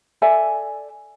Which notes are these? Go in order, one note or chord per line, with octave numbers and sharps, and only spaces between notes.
A4 D5 E5 G#5